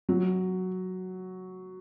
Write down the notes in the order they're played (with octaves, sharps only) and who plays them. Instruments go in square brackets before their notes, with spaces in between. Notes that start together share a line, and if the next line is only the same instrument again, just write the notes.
[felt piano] F#3